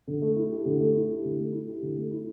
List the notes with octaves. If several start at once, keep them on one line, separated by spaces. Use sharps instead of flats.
D3
A3
E4
G4
D3
A3
E4
G4
D3
A3
E4
G4
D3
A3
E4